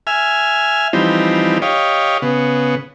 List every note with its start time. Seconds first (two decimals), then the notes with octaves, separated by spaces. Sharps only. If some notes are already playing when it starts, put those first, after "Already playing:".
0.07 E5 G#5 F6
0.93 E3 F3 G3 C4 D#4
1.62 G4 C#5 D#5 F5
2.22 C#3 B3